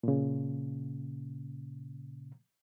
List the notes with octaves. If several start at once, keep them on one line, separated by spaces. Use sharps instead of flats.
A#2 C#3